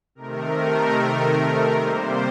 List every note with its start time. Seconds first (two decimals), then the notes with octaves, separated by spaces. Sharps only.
0.15 C3 D#3 A3 A#4
1.77 C3 G3 A#3 C5